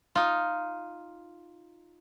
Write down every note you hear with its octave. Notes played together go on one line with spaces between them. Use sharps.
D#4 F4